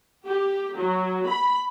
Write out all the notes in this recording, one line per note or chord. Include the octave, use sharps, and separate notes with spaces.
G4
F#3
B5